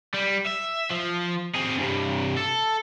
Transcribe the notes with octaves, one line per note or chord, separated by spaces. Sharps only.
G3
E5
F3
C4 G#4
G2 C3
A4